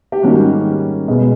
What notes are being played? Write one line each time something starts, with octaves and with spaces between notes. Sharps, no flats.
G4
G#2 D#3 G3 A#3 C#4 F#4
B2 G#3 B3